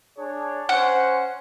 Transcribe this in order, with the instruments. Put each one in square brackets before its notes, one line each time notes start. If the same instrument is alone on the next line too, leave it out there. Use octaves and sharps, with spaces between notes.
[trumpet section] D4 G#4 C#5
[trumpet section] C#4 C5 [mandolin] F#5